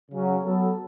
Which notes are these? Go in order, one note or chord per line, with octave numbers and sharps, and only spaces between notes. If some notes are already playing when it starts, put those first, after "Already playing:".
C#3 F#3 C#4
F#3 B3 A4